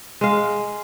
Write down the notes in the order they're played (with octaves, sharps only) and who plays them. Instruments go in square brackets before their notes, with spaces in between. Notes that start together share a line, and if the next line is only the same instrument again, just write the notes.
[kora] G#3 F5